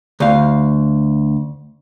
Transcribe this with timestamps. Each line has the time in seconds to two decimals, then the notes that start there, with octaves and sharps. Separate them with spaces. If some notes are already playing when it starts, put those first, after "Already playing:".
0.20 D2 F5